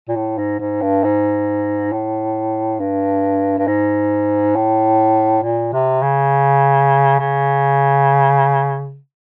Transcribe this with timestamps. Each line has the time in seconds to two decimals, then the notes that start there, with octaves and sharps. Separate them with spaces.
0.08 A#2
0.16 A2
0.38 G#2
0.60 G#2
0.82 G2
1.04 G#2
1.92 A2
2.79 G2
3.58 G2
3.67 G#2
4.56 A2
5.43 A#2
5.73 C3
6.02 C#3
7.20 C#3